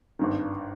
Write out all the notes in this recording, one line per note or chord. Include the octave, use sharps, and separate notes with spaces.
G#1 G2 D#3